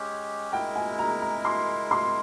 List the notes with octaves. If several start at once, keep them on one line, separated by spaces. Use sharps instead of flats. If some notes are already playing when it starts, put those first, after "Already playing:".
Already playing: G#3 C#4 G4
G#3 E4 A#4 G5
G#5
A#5
A#5
C6
C6